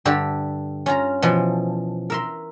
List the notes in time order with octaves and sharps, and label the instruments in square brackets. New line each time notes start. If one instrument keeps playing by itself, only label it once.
[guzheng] G2 D3 G4 E5 A5
C#4 F4 A#5
B2 E3 F3
A#4 E5 C6